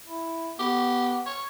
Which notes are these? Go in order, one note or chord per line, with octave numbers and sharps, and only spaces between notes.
E4
B3 G4
C#5